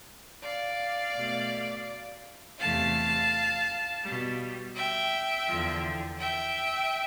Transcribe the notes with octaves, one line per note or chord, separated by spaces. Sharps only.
D5 F5
B2 A3
E2 C3 E3 A3 F5 A5
B2 G3
E5 G5
E2 D3 F3
E5 G5